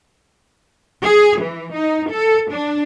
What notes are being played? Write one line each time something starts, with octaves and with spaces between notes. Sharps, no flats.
G#4
E3
D#4
A4
D4